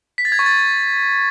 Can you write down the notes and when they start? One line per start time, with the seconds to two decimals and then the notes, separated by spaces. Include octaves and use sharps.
0.18 B6
0.25 A6
0.32 G#6
0.39 C#6
0.46 A6